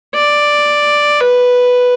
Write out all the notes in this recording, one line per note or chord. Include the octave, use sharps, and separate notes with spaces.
D5
B4